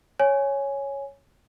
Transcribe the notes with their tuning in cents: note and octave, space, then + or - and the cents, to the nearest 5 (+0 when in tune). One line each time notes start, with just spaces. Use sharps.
C#5 +0 G#5 +0